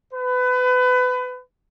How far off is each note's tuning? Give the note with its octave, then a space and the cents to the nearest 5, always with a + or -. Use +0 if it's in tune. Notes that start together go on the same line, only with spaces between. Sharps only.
B4 +25